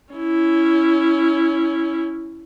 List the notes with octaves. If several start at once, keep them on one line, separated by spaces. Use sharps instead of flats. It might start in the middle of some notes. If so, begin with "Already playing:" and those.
C#4 E4